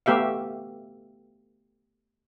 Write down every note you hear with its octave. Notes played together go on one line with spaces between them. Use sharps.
A3 B3 G4 E5 F5